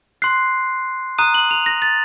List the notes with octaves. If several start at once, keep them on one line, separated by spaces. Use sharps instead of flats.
C6 F#6 C7
A#5 D#6 F#6 D#7
F#7
F7
A#6
A6